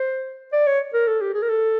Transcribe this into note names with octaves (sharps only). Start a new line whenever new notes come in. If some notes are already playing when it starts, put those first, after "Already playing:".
Already playing: C5
D5
C#5
A#4
A4
G4
G#4
A#4
A4